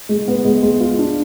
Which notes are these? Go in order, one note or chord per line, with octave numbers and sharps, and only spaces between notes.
G#3
B3
G#3
G#3
F4
D4